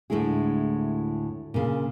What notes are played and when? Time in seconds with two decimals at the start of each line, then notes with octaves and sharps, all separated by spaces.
0.10 D2 A2 C3 G#3 E4 G#4
1.54 A#2 C#3